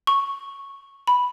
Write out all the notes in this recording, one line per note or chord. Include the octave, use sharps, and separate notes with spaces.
C#6
B5